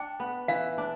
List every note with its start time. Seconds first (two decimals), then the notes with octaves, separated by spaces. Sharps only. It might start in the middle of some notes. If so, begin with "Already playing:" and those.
Already playing: D4 G5
0.20 B3
0.48 E3 F5
0.78 D4